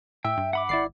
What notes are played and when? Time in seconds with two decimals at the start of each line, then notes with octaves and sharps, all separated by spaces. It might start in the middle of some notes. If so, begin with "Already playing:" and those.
0.25 A2 E5 G5
0.37 G2
0.53 F#5 B5 D6
0.69 G#1 E4 D5 C7